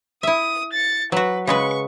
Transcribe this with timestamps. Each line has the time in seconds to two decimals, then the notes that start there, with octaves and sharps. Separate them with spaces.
0.23 E4 E5 D#6
0.73 A6 C#7
1.12 F#3 F#4 B4
1.47 C#3 G#3 B4 C#6